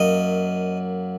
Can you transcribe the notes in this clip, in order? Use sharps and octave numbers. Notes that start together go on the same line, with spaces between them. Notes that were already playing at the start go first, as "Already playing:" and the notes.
Already playing: F#2 F#3 A#3 D#5